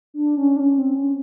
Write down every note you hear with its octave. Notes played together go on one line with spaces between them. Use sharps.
D4
C#4
D4
C#4
C4
C#4